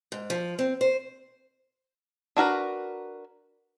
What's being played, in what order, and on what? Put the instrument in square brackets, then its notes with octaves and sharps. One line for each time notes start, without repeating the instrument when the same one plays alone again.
[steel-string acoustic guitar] G#2
F3
C4
C5
[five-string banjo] D4 F#4 A#4 B4